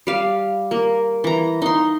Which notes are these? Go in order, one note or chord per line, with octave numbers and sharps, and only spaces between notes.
G3 F5
A#3 A#4
E3 A#5
D#4 C6